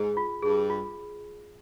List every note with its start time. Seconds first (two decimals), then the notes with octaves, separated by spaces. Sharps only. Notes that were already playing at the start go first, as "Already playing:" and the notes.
Already playing: G#2 G#4
0.17 F4
0.42 G2 G#4
0.70 F4